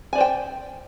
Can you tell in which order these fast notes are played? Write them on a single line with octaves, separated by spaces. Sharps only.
G#5 D5 C5 G5